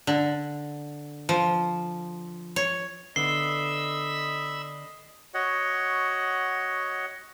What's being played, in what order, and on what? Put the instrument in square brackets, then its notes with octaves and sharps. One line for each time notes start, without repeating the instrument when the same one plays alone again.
[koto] D3
F3
C#5
[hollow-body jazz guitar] D3 B3 [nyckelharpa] D#5 [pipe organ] E5 B5 E6 [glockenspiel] C7 G7
[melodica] F#4 C#5 D#5 F#5